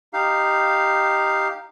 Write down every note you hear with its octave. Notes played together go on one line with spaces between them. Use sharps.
D#4 G4 F5